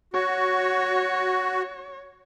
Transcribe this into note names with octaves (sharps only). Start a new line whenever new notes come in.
F#4 C#5